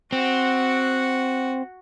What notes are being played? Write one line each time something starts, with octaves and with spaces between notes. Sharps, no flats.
C4 F#4 F#5